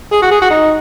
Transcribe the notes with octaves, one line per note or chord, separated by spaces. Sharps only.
G#4
F#4
G#4
F#4
D#4